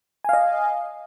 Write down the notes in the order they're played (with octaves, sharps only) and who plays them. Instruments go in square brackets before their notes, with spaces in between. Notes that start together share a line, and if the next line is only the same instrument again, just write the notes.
[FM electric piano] G#5
F5
D#5